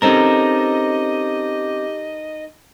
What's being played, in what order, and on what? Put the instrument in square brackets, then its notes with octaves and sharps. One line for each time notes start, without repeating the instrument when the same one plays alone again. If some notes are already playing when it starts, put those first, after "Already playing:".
[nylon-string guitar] C4 C#4 [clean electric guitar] D#4 A4 A#4 [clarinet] G4 [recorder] D#5